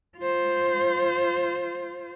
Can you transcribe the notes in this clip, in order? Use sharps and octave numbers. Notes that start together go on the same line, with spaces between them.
F4 C5